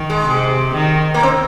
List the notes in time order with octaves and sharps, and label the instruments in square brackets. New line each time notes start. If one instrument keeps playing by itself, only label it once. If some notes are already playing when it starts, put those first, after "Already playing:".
Already playing: [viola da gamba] D#3
[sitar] G#3
[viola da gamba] C3
D#3
[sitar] A#3
C4